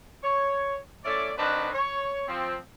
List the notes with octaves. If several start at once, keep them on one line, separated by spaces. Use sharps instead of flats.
C#5
A3 C#4 E4 D5
D#3 C4 D4 D#4 F#4 B4
C#5
F3 C4